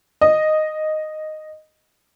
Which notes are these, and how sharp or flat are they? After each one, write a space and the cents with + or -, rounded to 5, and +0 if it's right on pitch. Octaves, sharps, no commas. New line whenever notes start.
D#5 -5